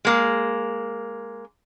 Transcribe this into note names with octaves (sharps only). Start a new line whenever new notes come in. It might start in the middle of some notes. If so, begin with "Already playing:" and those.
G#3 A#3